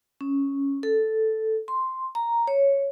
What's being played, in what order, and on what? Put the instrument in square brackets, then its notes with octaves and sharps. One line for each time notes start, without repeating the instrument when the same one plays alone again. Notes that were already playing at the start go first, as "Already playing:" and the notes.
[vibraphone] C#4
A4
C6
A#5
C#5